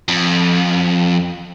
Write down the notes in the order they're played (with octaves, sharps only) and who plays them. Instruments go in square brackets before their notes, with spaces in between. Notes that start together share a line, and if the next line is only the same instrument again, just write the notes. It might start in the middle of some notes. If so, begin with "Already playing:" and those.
[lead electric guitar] F2